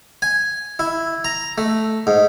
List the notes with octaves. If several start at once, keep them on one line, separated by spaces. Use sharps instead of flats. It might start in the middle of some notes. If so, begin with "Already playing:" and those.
G#5
E4
A#5
A3
G#2